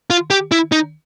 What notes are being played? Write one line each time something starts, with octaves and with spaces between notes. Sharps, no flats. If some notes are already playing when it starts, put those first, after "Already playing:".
F4
G4
E4
D#4